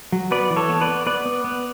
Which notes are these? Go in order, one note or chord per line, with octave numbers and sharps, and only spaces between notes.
F#3
B3 B4 D5
E3
A4 C#5
B3
B4 D5
B3
B3 B4 D5
B3
B3